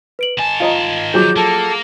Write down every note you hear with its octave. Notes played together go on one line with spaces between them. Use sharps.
B4 D7 F#7
D#3 G#5 A5
F4 D#5 F5 A#5
F3 F#3 G#4 D6 G6
A#3 A4